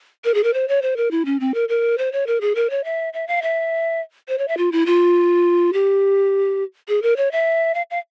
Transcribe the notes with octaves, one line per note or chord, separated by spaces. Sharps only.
A#4
G#4
A#4
C5
C#5
C5
A#4
E4
C#4
C4
A#4
A#4
C5
C#5
A#4
G#4
A#4
C#5
E5
E5
F5
E5
C5
C#5
E5
F4
E4
F4
G4
G#4
A#4
C#5
E5
F5
F5